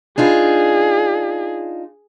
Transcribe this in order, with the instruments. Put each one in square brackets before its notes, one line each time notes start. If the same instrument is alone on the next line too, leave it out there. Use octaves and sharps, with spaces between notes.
[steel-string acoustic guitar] D4 D#4 F4 [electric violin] G#4